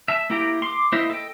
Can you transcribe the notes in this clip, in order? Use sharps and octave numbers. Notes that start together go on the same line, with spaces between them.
E5 A5
A#3 E4 G4 G5 A#5
C6 D6
A#3 E4 C5 D#5 E5
A4 D#5 G5